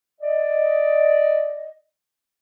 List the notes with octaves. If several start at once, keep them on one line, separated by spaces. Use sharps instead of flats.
D5 D#5